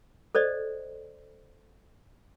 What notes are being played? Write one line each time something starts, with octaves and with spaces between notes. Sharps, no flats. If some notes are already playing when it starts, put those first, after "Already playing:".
A4 C5 D5 D#5